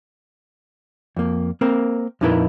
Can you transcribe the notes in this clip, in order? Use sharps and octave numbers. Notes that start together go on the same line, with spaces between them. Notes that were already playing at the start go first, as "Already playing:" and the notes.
F2 A#3
A#3 C4 A#4
F2 A#2 D#4 E4 A#4 B4